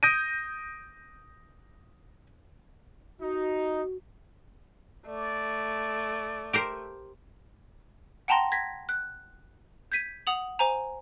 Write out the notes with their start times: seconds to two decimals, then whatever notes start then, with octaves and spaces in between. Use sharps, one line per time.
0.03 D#6 G6 A#6 D7 D#7
3.20 D#4 F#4
5.07 A3 D5
6.53 G4 A#4 C5
8.28 F#5 G5 A5 A#5 C6 A#6
8.52 G#6 A#6 B6
8.89 F#6
9.92 G6 G#6 B6 D#7
10.27 F#5 D#6 F7 F#7
10.59 C5 G#5 A#5